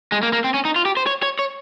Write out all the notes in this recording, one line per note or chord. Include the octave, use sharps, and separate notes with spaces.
G#3
A#3
A#3
C4
C#4
D#4
F4
G4
C5
C#5
C#5
C#5